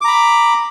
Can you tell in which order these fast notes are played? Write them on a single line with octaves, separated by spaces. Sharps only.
D6 A#5 B5